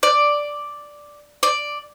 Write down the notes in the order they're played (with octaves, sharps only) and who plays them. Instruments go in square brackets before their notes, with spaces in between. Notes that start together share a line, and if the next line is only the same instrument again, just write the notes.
[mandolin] D5
D5